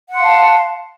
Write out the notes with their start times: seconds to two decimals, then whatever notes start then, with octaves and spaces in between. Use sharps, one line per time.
0.09 F#5
0.14 C6
0.19 F5
0.24 A5